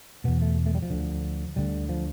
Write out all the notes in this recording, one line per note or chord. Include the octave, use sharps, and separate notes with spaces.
E2 B2 B3
A3
A3
G3
F3
D2 D3
D2 D3 G3
F3